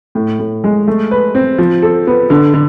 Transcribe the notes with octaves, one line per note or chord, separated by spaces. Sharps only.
A2
A2
G#3
A3
B4
C4
F3
A4
B3
D3
D3